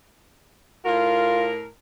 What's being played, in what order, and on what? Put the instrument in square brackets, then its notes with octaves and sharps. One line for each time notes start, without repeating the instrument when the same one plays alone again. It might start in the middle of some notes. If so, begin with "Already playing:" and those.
[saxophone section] A2 A#4 [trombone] F4